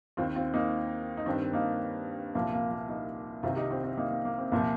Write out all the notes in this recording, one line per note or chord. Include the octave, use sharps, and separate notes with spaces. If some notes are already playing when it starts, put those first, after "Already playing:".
D#2 D#3 C4 F4
C4 F4
A#3 D#4
D#4
G2 D#3 C4
A#3 D#4
C2 A#2 F3 A#3
A#3
A#3
A#3 D#4
C2 C3 D#3 C4 F4
D#4 G4
C4 F4
C4
A#3 D#4
A#3
A#3
C4
C2 A#2 F3 A#3